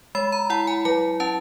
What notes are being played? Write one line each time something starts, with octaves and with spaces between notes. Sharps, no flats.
G#3 B5
A#5
E4 F#5
G#5
F#3 G#5
C#4 A5